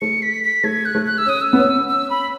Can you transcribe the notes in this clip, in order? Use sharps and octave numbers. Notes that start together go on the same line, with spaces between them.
A3 C#7
B6
B6
A3 G#6
F#6
A3
F#6
E6
C#4 D#6
E6
B3
C#4
E6
B5